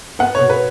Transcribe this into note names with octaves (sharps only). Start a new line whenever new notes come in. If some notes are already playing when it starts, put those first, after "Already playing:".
B3 F#5
B2 C#5
B4